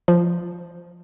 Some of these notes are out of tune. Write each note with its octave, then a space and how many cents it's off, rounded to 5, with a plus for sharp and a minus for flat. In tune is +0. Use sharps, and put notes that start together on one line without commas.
F3 -5